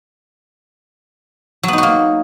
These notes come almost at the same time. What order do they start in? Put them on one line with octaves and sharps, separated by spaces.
F#3 B3 D#4 F#4 A#3